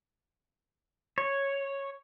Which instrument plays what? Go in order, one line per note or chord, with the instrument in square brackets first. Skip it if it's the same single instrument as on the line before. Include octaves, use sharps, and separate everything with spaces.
[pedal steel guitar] C#5